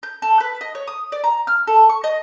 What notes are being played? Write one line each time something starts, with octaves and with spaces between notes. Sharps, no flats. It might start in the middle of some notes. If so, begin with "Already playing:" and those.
G6
A4
B4
D#5
C#5
D#6
D5
A#5
F6
A4
C#6
D#5